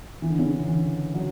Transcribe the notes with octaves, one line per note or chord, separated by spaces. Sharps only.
E3
D3
C#3
D3
E3
F#3